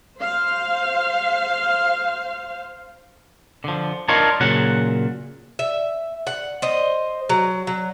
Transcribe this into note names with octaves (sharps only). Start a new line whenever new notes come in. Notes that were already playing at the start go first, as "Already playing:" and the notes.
C5 F5
D3 F3
D4 D#4 F4 A#4 C#5
A#2 C#3 F#3 F#5
E5
F#5
C5 D#5
F#3
F#3